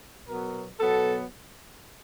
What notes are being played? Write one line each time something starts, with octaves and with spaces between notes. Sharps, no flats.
B2 F#3 B3 A#4
B2 F#3 B3 A4